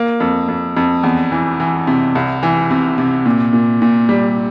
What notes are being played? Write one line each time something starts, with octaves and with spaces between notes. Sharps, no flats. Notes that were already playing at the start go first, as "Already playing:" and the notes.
Already playing: A#3
F2
F2
F2
E2
E3
E3
C3
C2
E3
C3
C3
A#2
A#2
A#2
G3